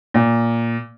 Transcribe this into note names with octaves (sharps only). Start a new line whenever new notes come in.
A#2